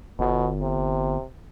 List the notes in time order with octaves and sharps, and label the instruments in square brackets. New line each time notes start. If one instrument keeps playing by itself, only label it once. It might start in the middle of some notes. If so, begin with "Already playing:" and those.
[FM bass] G1 [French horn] B2
[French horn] C3